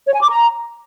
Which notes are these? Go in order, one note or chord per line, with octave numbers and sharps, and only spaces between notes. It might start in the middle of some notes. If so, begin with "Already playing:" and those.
C#5
G#5
D6
A#5